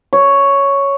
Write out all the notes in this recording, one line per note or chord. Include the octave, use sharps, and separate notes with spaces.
C#5